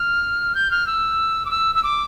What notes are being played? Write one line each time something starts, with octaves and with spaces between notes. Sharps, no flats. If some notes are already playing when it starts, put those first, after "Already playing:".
Already playing: F6
G6
F6
E6
D6
E6
E6
D6